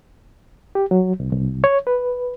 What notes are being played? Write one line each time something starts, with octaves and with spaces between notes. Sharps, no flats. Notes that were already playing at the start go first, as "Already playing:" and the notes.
G4
F#3
C2
C2
C#5
B4